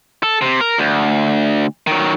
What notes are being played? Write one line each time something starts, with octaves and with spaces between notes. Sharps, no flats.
A4
C3
A#4
D2
D#3 F#3